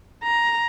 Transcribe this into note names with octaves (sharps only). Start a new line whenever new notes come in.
A#5